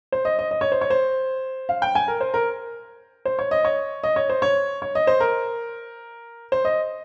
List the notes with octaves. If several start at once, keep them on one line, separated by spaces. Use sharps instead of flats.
C5
D#5
D#5
D#5
C#5
C5
C#5
C5
F5
G5
G#5
A#4
C5
A#4
C5
C#5
D#5
C#5
D#5
C#5
C5
C#5
C#5
D#5
C5
A#4
C5
D#5